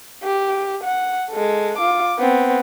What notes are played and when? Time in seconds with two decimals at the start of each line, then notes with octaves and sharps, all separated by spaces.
0.23 G4
0.83 F#5
1.31 G#3 A4
1.78 F4 D6
2.19 B3 C4